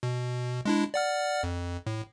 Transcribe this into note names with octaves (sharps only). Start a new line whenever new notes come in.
B2
G#3 D4 E4
D5 F#5 F6
F2
A2